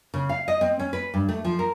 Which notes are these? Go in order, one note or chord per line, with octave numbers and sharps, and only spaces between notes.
C#3
F5
D#5
C4
C#4
B4
G2
A3
F3
A#4